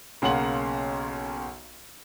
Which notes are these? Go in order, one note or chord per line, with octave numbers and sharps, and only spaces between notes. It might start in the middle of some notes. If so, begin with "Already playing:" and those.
B1 C#3 A#3 F#5 C6 F#7